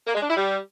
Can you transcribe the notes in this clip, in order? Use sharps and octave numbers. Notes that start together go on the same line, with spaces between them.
A#3
G#3
D4
E4
G3